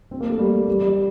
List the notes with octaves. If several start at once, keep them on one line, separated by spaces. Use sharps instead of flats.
C4
A#3
A3
G3
G3
G3